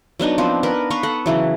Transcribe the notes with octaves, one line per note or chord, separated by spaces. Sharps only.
F#3 B3 D4 D#4
F3 B3 C4
B3 A#4 B4
B3 B4 F5 C#6
A4 F#5
C#3 E3 F#3